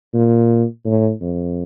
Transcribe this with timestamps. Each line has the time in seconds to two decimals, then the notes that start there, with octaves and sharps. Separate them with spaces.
0.14 A#2
0.85 A2
1.21 F2